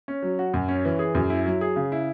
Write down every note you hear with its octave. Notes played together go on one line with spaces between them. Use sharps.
C#4
F#3
F#4
F#2
C#4
E3
G#4
F#2
E4
F#3
G#4
C#3
E4